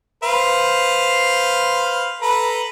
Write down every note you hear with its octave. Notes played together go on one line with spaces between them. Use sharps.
B4 C5 F5
A4 B4 A#5